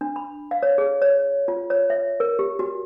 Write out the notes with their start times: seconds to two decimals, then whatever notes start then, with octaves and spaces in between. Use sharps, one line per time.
0.01 D4
0.16 B5
0.51 F5
0.63 C#5
0.78 G#4
1.02 C#5
1.48 F4
1.70 C#5
1.90 E5
2.20 A#4
2.39 G4
2.59 F#4